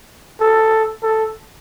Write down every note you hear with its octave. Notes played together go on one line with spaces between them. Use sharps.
A4
A4